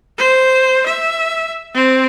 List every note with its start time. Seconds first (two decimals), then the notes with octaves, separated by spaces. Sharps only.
0.18 C5
0.86 E5
1.74 C4